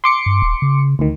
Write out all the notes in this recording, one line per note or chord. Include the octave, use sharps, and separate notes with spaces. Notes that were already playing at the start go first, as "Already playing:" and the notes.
C6 D6 C#7
G2
D#1
C#3
D2 D#3